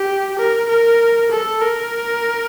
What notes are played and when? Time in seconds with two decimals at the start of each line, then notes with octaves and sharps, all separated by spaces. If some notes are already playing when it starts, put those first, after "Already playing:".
Already playing: G4
0.38 A#4
0.69 A#4
1.31 A4
1.61 A#4